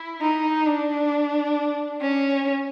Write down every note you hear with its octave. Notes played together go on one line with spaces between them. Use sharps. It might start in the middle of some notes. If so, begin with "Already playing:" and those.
Already playing: E4
D#4
D4
C#4